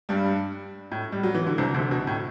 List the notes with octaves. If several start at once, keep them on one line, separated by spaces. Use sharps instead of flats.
G2 G3
A2
G3
F#3
E3
D3
C2 C3
D2 D3
B2
A2